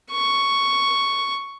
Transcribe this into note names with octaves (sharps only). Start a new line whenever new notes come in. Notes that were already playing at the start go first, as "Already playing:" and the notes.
C#6